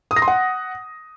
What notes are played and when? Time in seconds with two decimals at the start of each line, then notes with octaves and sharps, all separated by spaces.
0.11 D#6
0.16 A#6
0.22 C6
0.28 F#5